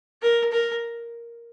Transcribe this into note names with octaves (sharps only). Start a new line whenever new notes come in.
A#4
A#4